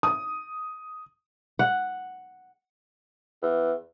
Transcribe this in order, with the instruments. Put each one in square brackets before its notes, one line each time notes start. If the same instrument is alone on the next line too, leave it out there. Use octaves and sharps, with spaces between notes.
[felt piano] D#6
[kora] F#5
[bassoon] E2